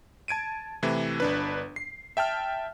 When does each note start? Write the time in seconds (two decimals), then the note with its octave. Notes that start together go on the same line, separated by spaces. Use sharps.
0.28 A5 G#6 D7 D#7
0.83 C3 E3 A3 E4
1.20 G1 D4 B4
1.76 C7
2.17 E5 G5 A5 F6